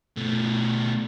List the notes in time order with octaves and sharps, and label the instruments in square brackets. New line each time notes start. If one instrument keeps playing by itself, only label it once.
[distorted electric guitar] B2 A3